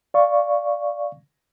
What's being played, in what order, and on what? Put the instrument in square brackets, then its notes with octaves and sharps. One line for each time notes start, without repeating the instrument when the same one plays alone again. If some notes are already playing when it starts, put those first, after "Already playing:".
[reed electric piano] D5 F5 C#6